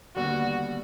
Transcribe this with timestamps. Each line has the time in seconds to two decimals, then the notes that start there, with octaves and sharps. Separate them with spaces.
0.16 D#2 D3 G3 B3 F#4